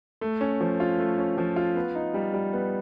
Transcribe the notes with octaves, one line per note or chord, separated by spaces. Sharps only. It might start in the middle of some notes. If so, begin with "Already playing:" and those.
A3
C#4
F3
F4
A3
C#4
F3
F4
B3
D#4
G3
G3
B3